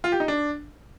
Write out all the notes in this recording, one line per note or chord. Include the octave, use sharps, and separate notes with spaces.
F4
G4
D#4
D4